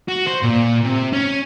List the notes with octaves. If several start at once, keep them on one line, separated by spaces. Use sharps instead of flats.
F#4
C5
A#2
C3
C#4